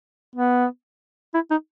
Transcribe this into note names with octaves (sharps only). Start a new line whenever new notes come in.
B3
E4
D#4